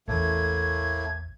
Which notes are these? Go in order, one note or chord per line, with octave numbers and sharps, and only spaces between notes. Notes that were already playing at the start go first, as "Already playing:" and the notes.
A1 E2 A2 A3 A#3 G#6